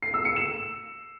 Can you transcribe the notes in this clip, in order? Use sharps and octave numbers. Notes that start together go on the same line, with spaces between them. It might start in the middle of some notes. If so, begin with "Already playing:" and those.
C7
E6
C#7
E7